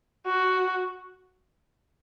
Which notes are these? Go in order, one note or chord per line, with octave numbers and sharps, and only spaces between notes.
F#4